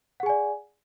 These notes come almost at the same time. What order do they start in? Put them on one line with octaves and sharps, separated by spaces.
F#5 G#4 G#5 D5